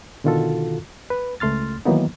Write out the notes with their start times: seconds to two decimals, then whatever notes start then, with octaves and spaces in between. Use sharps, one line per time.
0.24 B2 D3 D#3 F4 F#4 A4
1.10 B4
1.40 C#2 A3 C6 F6 A6
1.85 D#3 E3 F#3 A#3 B3 D#4